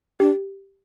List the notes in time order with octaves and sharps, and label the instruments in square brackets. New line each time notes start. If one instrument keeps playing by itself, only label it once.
[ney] D4 [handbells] G4